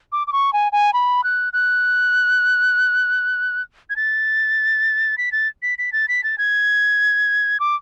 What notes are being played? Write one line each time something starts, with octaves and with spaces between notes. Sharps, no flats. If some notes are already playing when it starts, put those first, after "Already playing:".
D6
D6
C#6
G#5
G#5
B5
F#6
F#6
G#6
A6
B6
A6
B6
B6
A6
B6
A6
G#6
D6